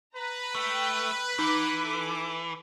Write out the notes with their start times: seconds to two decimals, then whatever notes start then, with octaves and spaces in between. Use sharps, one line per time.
0.15 B4 A#5
0.55 A3 G5
1.39 E3 D#4 F#5 D6 F#6
1.78 A4 D6